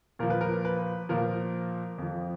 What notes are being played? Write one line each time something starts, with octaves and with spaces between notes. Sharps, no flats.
A#2 F3 A#4
B4
A#4
B4
A#2 F3 A#4
F2 F3